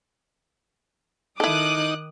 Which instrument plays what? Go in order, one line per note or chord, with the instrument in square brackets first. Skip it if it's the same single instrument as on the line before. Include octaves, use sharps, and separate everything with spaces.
[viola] D#3 D6 [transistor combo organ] D#4 [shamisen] E4 A4 [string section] D#6 F#6